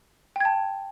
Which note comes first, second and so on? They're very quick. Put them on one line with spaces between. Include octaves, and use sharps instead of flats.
G5 G#6 A5